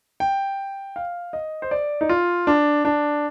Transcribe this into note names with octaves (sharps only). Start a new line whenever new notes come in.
G5
F5
D#5
C5
D5
D#4
F4
D4
D4